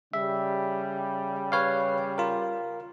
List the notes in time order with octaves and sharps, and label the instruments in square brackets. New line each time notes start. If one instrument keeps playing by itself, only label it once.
[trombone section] C#3 G3 [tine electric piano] E5
[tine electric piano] B4 C#5 F5
F4 A#4